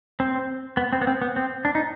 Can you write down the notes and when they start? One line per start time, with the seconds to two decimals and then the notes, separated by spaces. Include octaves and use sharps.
0.20 C4
0.77 B3
0.93 C4
1.01 B3
1.07 C4
1.22 B3
1.36 C4
1.65 D4
1.75 D#4